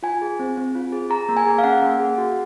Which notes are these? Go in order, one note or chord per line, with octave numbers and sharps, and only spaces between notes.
F4 G#5
G#4
C4
C4
F4
G#4
G#4 A#5
A#3
G#5
G#4
F5
C#4 F#5
A#3
G#4
F#4